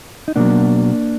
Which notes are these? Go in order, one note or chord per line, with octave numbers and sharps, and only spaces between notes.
D#4
B2 F#3 A#3 D4